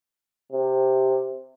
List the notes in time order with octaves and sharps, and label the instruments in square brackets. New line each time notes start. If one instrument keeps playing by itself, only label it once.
[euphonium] C3